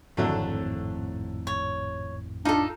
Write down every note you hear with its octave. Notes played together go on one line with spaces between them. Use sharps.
G#1 F2 A2 D3 F#3 A3
C#5
D4 D#4 F4 A4